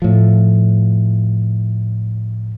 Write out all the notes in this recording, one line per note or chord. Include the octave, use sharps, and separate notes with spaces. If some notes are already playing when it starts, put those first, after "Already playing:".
A2 F3